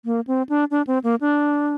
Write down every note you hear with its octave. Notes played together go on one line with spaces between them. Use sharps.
A#3
C4
D4
D4
C4
A#3
D4